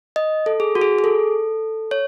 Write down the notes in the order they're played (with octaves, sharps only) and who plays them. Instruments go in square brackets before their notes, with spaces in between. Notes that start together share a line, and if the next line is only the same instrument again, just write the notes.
[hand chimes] D#5
A4
G#4
F#4
G#4
G#4
A4
C#5